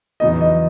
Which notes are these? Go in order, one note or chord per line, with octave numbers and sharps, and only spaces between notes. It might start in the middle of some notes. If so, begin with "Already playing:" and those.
E2 C#3 F#3 B3 D#4 D#5
D#5